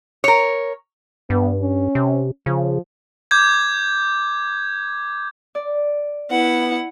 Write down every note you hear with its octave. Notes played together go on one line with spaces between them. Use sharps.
A#4 C#5
G2 B3
C#4
C3
C#3 F3
D6 G6 G#6
D5
B3 E4 F#5